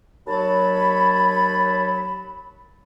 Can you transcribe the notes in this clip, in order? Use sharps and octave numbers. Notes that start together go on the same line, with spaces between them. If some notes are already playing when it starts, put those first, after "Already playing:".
D#2 F#3 C#5 A5 B5